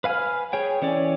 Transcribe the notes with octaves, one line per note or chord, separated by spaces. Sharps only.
B4 F5 G#5 F6
G#4 C#5 G5
E3 C#4 C#5 D5